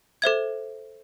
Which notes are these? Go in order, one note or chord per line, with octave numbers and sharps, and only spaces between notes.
A4 C5 E5 G#6